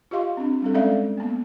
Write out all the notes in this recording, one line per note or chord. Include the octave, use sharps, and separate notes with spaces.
F4 G4 D#5 F5 C6
C4 D4
G3 C4 A4
G#3 C#4 A4 D5 E5 F5
A#3 B3